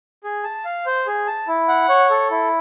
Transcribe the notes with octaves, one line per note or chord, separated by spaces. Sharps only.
G#4
A5
F5
C5
G#4
A5
E4
F#5
C#5
A4
E4